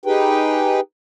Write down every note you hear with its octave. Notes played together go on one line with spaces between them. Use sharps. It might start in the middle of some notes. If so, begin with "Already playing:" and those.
D#4 G4 G#4 B4 G5